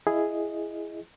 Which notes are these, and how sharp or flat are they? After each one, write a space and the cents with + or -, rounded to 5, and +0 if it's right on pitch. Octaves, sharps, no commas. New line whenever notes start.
E4 +15 G#4 +0 D#5 +0